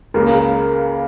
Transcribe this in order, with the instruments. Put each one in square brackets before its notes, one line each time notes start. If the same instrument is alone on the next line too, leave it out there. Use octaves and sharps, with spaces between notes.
[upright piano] C#2 C#3 A#3 [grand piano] A#4